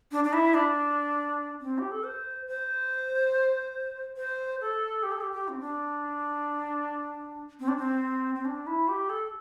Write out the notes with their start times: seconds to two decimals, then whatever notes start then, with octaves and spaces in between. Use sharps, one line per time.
0.12 D4
0.24 D4
0.33 E4
0.54 D4
1.61 C4
1.78 G4
1.91 A4
2.04 C5
2.47 C5
4.17 C5
4.61 A4
5.03 G4
5.12 A4
5.21 G4
5.32 G4
5.48 C4
5.60 D4
7.60 C4
7.68 D4
7.77 C4
8.35 C4
8.45 D4
8.67 E4
8.88 G4
9.09 A4